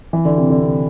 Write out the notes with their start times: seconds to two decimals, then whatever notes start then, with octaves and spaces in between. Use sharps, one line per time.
0.13 E3
0.25 D3
0.37 C3
0.50 D3
0.61 C3